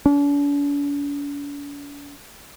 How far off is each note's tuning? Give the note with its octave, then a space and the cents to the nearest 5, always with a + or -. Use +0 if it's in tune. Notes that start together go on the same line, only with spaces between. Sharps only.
D4 -45